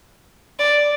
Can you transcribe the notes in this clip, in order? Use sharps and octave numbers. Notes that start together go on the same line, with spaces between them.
D5